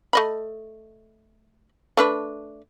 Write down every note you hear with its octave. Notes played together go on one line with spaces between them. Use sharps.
A3 D#5 B5
A3 D4 B4